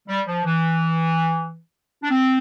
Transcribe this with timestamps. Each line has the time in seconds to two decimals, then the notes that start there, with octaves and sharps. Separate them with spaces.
0.08 G3
0.27 F3
0.45 E3
2.03 D4
2.11 C4